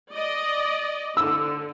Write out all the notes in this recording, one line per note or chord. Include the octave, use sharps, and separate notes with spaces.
D5 D#5
D3 E6